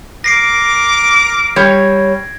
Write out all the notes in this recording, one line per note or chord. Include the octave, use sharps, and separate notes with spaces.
A#4 D6 A#6 C7 D7
G3 C#5 G#6